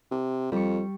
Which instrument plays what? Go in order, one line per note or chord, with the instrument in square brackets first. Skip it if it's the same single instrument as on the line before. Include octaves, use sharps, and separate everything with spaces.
[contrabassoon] C3
[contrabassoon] F2 [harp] G3 C#6